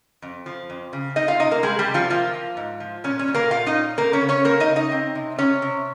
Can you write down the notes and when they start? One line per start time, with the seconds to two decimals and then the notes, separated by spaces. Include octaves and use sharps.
0.22 F2
0.46 F3
0.70 F2
0.93 C#3
1.16 C4 D#4 D#5
1.28 F4 F5
1.40 C3 D#4 D#5
1.51 A#3 A#4
1.63 G3 G#3 G#4
1.79 G3 G4
1.87 C3
1.94 F3 F4
2.10 F3 A#3 F4
2.34 F3
2.57 G#2
2.80 F3
3.04 A#2 C#4
3.19 C#4
3.28 A#2
3.34 A#3 A#4
3.51 A#2 F4 F5
3.66 D#4 D#5
3.74 C#4
3.98 A#3 C4 A#4
4.13 C#4 C#5
4.21 C#3
4.29 C#4 C#5
4.45 A#3 C4 A#4
4.60 D#4 D#5
4.68 C#3
4.76 D#4 D#5
4.92 C4
5.15 C3
5.38 C3 C#4 C#5
5.62 C3